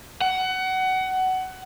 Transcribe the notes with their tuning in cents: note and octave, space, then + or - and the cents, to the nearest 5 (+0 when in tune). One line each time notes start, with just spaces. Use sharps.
F#5 +20